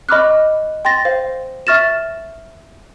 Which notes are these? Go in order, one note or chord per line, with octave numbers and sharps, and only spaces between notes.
D#5 B5 C#6 D6 F6 F#6
G5 C6 A6 A#6
C5 F5
E5 C#6 F6 A6 A#6 E7